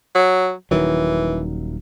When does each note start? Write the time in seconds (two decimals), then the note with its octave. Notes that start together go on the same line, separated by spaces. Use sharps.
0.15 F#3
0.71 D#1 D#3 E3 F#3